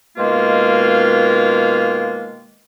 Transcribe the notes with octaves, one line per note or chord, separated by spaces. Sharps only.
B2 D#3 G#3 A#3 F4